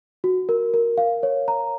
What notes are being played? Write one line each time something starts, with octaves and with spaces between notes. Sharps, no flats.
F#4
A#4
A#4
F5
C#5
A#5